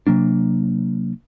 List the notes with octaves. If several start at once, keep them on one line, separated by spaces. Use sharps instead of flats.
C3 F#3 A#3 D4